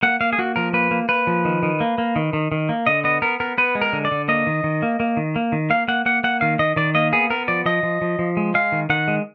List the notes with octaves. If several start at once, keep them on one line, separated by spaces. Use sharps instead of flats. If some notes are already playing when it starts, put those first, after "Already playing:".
A#3 F#5
A#3 F5
G#4
A#3 F#4
F3 A#4
A#3 B4
A#3
A#3 B4
F3
D#3
D#3
A#3
A#3
D#3
D#3
D#3
A#3
D3 D#5
B3 D#5
B3 A#4
B3 A#4
B3 B4
G#3
A#4
D3
D5
D3
A#3 D#5
D#3
D#3
A#3
A#3
D#3
A#3
D#3
A#3 F5
A#3 F#5
A#3 F#5
A#3 F#5
D#3 F5
D#3 D#5
D#3 D5
A#3 D#5
B3 G#4
B3 A#4
F3 D5
F3 D#5
F3
F3
F3
G#3
G#3 F5
D#3
D#3 F#5
G#3